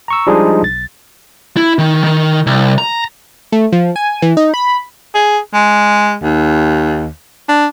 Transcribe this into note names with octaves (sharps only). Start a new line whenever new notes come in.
A#5 C#6 E6
F3 G3 G#3 D4 D#4 G#4
B1 A6
E4
D#3
D#3
C2
A#5
A3
F3
G#5
E3
D#4
B5
G#4
G#3
D#2
D4